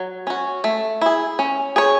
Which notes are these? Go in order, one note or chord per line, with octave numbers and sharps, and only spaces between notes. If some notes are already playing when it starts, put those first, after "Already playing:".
Already playing: F#3
C#4 F#4
A3
E4 G#4
C#4
G#4 C#5